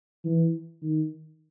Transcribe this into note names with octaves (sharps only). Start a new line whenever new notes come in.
E3
D#3